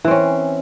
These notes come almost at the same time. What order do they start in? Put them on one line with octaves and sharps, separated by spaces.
E3 C4 C#4